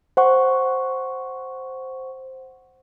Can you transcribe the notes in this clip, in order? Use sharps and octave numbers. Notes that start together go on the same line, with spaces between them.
C5 F#5 C#6